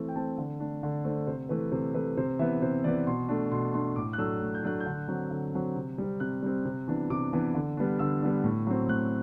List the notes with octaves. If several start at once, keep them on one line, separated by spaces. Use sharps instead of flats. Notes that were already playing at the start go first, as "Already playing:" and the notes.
Already playing: E3 A3 C4
G5
A3 C4 A5
D3
A3 D4
D3
A3 D4 C5
C3 C5
E3 A3 B4
C3 C5
E3 A3 B4
C3 C5
E3 B3 E5
C3 C5
E3 B3 D5
B2 C6
A3 D4
B2 C6
A3 D4 C6
A2 D6
F#6
F#3 A3 D4 E6
A2
G6
F#3 A3 D4 F#6
G6
D3
F#3 C4
D3
F#3 C4
C3
G3 C4
C3 F#6
G3 C4
C3
E3 B3 D4
C3 D6
E3 B3 D4
D3
G3 B3 D4
D3 E6
G3 B3 D4
A2
F#3 C4
A2 F#6